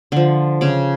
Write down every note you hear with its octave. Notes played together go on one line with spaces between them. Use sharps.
D3 F3
C#3 D6